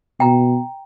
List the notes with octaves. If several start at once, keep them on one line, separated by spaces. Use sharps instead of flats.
B2 G5 A#5